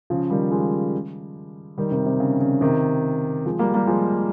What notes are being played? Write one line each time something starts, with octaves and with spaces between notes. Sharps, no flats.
C#3 F3
D#3 G3
F3 G#3
D#3 G3
C3 D#3
C3
C#3
C#3
C3 D#3
F3 G#3
G3 A#3
G3 A#3
F3 G#3